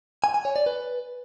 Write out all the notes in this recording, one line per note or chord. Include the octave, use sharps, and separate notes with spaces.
G#5
G#5
C#5
D5
B4